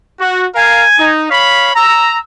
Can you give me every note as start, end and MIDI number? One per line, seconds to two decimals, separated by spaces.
0.20 0.47 66
0.55 0.86 70
0.55 0.86 77
0.55 1.10 80
0.99 1.29 63
1.30 1.73 73
1.30 1.73 77
1.30 1.73 83
1.30 1.65 95
1.75 2.18 82
1.75 2.19 88